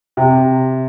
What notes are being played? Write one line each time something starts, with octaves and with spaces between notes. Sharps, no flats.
C3